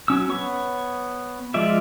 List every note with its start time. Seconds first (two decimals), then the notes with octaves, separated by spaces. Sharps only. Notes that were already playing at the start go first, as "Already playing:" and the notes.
0.08 F#3 C#4 E6
0.29 B3 C#5 C#6
1.54 F3 G#3 F4 D5 E5